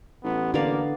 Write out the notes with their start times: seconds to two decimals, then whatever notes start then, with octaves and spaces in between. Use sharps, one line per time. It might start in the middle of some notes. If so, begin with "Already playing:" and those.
0.24 A1 B3
0.54 D3 A#3 B3 D5 F5